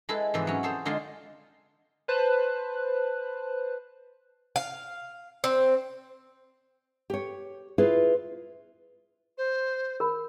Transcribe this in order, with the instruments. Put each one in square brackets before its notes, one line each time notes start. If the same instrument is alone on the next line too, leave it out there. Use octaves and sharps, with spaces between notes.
[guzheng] G#3 E4 A4 B4
G#2 C3 E3 F3 E4 B4
F#3 C#4
G#4 A4 C5 C#5
D3 G#3 D#4 F4
[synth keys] B4 C5 A5 F#6
[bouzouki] F5
C4
[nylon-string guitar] G4 C#5
E4 F4 G#4 B4
[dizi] C5
[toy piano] A#4 B5